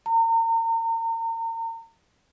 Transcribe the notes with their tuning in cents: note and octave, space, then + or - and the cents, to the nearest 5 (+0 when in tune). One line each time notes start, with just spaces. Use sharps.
A#5 -35